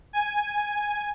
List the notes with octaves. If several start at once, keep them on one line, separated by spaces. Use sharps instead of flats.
G#5